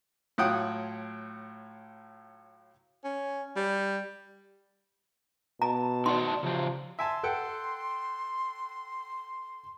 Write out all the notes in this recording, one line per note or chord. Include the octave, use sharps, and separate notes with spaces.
A2 F#3 F4 F#5 G5 D#6
C#4
G3
B2 A5 A#5
D#4 F#4 D5 C6
C#3 F3 G4
E5 G#5 A5 C6
A4 F#5 G5